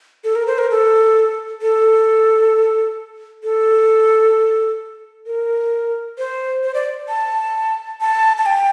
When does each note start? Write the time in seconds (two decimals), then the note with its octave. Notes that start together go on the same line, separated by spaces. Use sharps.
0.24 A4
0.35 A#4
0.47 C5
0.58 A#4
0.71 A4
1.62 A4
3.43 A4
5.26 A#4
6.18 C5
6.63 C5
6.74 D5
7.09 A5
8.01 A5
8.38 A5
8.46 G5